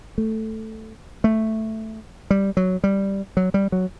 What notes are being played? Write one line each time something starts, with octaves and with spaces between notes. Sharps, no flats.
A3
A3
G3
F#3
G3
F#3
G3
F#3